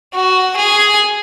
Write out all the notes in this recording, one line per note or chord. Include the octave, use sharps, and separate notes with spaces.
F#4
G#4